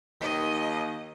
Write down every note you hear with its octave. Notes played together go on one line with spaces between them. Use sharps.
D#2 D#3 D#5